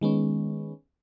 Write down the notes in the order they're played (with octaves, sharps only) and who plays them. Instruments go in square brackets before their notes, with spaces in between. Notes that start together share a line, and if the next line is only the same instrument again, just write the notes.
[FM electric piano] D#3 G#3 B3 C#4